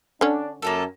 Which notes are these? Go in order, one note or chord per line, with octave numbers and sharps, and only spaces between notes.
D3 C#4 D4
F#2 A#3 F4 A4